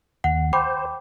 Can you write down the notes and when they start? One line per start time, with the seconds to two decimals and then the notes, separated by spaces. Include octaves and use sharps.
0.24 D#2 F#5
0.53 C5 G5 B5 D6